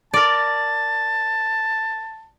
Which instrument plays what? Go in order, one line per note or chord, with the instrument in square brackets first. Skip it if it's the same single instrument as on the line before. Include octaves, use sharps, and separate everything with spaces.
[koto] A#4 D5 [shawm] A5